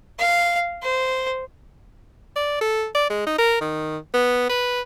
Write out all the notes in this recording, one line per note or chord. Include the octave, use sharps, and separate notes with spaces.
F5
C5
D5
A4
D5
G#3
D#4
A#4
D#3
B3
B4